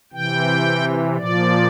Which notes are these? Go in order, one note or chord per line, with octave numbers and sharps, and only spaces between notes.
C3 E3 G5
A#2 F3 D5